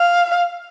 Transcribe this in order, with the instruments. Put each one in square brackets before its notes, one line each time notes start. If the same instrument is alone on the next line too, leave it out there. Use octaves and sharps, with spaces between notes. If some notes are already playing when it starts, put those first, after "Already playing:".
Already playing: [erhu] F5